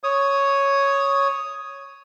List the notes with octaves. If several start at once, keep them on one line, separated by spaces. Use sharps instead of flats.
C#5 D#6